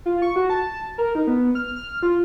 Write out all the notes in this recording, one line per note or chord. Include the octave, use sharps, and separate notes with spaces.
F4
C#6
F#4
A5
A#4
D#4
B3
F6
F6
F4